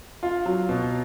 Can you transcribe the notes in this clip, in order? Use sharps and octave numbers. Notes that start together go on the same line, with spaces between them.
F4
F#3
B2